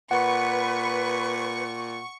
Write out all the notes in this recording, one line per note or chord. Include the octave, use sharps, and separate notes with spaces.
A#2 B4 F#5 C#6